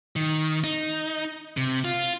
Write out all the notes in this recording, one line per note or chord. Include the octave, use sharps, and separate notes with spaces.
D#3
D#4
C3
F4